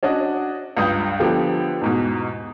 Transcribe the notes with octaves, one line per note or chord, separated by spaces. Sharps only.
C#4 D4 F#4 D#5
C#2 G2 D#6 G6
D3 F3 B3 G4
E2 G#2 B2